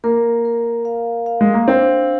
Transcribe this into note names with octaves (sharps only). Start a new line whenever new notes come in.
A#3 A#4
A#4
F5
F5
G#3
A#3
C4 D4